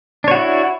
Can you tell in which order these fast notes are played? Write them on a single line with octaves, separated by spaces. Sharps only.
D4 C#5 F#4 E4